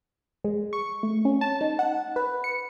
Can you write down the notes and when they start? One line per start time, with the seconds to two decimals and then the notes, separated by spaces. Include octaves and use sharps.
0.44 G#3
0.73 C#6
1.03 A3
1.25 C#4
1.41 A5
1.61 D#4
1.79 F#5
2.16 B4
2.44 C#7